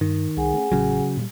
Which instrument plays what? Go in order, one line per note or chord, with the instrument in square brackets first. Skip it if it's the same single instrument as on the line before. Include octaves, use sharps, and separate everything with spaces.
[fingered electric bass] G2 [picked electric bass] D#3
[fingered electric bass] C2 [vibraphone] G#4 F#5 G#5
[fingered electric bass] A3 C#4
[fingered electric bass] A1 [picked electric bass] C#3 F#3
[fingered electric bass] A#2 F#3 G3